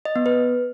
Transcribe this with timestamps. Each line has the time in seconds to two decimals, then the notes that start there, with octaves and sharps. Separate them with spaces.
0.05 D#5
0.16 B3
0.26 B4